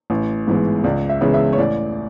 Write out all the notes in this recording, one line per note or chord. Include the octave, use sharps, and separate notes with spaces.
A1
G#2 E3 G#3 B3
C#2 D5
E5
C#3 E3 G#3 B3
E5
C#5
A1 D5